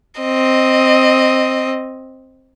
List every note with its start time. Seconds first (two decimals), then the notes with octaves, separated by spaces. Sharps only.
0.21 C4 D#5